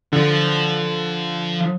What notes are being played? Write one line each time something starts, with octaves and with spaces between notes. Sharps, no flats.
D3 F3